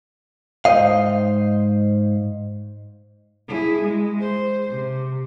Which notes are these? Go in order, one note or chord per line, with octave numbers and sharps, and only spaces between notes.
G#2 C#3 C5 D#5 F5
E4 G#4
G#3
C5
C3